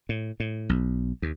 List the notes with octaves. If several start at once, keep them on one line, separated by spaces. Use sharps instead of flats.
A2
A2
B1
D#2